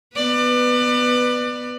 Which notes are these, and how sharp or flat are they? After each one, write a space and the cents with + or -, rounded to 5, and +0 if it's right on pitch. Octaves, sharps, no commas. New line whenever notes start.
B3 +5 B4 +0 D5 +30